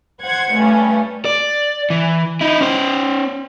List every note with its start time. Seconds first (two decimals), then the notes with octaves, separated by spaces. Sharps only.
0.24 C5 F#5 G#6
0.56 G2 A3 C#4
1.25 D5
1.90 E3
2.41 D#4 E4
2.61 C#4 C5